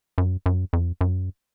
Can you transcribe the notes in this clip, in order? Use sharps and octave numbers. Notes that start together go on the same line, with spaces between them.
F#2
F#2
F2
F#2